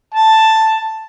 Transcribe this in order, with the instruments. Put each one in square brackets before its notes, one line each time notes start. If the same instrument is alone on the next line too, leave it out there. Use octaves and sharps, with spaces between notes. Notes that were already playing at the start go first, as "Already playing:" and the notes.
[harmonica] A5